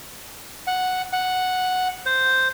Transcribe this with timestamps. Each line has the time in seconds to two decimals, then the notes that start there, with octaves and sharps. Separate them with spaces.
0.67 F#5
1.13 F#5
2.06 C5